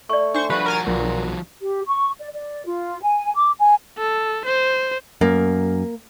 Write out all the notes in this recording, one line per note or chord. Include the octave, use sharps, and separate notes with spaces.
A3 D5 C#6
D4 C5 C#6
F3 F#4 G4 B4
A#4 G#5 A6
B1 A#2
G4
C#6
D5
D5
F4
G#5
D6
G#5
A4
C5
F#2 A#3